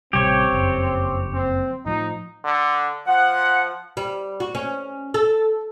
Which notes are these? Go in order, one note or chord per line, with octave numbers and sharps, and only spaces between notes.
A1 C3 G3 C4 G4 C#5
F#1 F2
C4
A2 F3 D#4
D3
F3 F#5
G3
F#4
C#4
A4